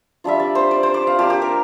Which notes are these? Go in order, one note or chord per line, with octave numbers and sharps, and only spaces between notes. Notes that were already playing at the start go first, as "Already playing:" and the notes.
G3 D4 F4 E5
D5
C5
D5
C5
D5
F5
A#3 D4 F4 G4
G4
A#4